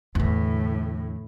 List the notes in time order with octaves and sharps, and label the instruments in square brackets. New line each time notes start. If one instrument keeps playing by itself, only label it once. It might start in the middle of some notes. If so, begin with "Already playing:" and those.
[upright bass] E2 D3 [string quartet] A2